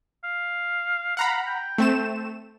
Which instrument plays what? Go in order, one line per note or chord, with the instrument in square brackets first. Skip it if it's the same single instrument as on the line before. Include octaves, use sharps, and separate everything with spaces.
[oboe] F5
[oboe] F5 [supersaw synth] F#5 A#5 B5
[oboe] G5
[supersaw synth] A3 C4 E7